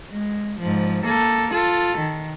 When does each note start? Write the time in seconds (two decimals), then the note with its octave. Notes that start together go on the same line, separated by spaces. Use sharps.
0.11 G#3
0.60 G#2 F3
1.05 A#3 A4
1.51 F4 A4
1.98 D#3